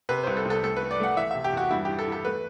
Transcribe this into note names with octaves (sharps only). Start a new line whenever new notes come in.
C3 B4
C2 C5
A4
C2
A4
A3 A4
A3 B4
D5
A3 F#5
E3 E5
C3 E5
G4
E2 F#4
G2 E4
E3 G4
A4
E3
A4
A3 B4